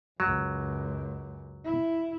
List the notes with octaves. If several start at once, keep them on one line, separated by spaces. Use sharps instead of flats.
C#2 F#2 F#3
E4